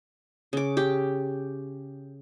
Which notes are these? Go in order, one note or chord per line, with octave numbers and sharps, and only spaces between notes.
C#3 D6
G4